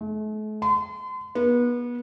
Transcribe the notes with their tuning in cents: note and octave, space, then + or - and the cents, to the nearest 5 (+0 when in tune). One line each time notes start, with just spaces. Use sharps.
A3 -45
C6 -40
B3 -30